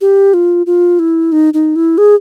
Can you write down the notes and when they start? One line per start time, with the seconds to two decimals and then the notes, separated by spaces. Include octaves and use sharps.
0.01 G4
0.34 F4
0.66 F4
0.99 E4
1.32 D#4
1.54 D#4
1.76 E4
1.98 G#4